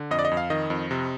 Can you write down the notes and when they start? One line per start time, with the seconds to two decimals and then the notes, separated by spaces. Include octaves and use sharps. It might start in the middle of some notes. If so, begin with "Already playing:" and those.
Already playing: D3
0.11 F2 D#5
0.19 D5
0.25 D#5
0.31 F2
0.37 F5
0.50 D#3 D#5
0.70 F2
0.91 C3